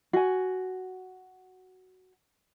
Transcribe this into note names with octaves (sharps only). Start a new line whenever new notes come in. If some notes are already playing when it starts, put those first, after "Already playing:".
F#4 G#5